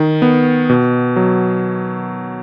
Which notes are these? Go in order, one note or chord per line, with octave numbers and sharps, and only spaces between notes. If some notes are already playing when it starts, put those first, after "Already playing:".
Already playing: D#3
B3
B2
F#3